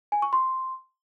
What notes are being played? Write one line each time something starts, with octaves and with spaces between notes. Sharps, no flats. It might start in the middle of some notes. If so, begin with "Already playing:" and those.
G#5
C#6
C6